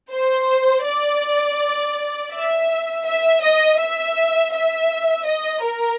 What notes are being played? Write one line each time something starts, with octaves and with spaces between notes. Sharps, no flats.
C5
D5
E5
E5
D#5
E5
E5
D#5
A#4